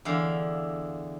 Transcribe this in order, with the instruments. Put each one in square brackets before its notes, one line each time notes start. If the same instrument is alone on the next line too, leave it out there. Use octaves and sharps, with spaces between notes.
[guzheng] E2 D3 F5